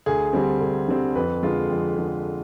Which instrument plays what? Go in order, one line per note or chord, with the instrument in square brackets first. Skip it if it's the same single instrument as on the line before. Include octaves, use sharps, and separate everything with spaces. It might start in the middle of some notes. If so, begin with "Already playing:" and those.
[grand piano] D2 G#4
D3 G3 C4
D2
D3 G3 C4
F2 B4
D3 G#3 F4
F2
D3 G#3